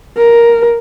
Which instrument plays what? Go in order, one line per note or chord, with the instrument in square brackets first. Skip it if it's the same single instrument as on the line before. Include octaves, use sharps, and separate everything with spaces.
[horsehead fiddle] A#4